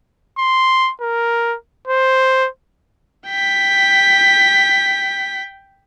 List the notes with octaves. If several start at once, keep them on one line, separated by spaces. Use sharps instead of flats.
C6
A#4
C5
G5 B6